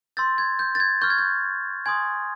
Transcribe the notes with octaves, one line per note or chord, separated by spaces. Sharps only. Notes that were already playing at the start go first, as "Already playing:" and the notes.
C6 E6 G6 A6
G#6
G6
A6
G#6
C#6 F6 G6
G#6
G6
G#5 C6 D#6 G#6